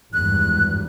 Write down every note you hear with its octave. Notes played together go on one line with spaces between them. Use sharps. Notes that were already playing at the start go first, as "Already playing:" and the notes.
G#1 E2 G2 F#6